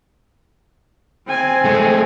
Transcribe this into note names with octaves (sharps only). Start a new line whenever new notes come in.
C4 G#5
G#3 A3